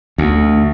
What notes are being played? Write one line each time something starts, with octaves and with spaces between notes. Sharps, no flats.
D2